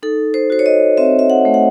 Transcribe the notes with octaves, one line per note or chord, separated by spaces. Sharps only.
D#4 A4
C5
F#4 C5
C#5
D#5
C4 E5
E5
F#5
A3
F#5